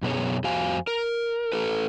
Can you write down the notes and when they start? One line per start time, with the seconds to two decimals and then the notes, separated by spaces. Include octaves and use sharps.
0.02 F#2 B2 B3 G#4 C#5
0.44 F2 F#4 C5 F5 G#5
0.87 A#4
1.52 A3 A4 B4